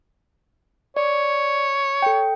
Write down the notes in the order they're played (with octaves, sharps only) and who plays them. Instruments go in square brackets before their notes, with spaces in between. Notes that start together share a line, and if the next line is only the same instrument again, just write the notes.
[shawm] C#5 [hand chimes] D5
[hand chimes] A4 G5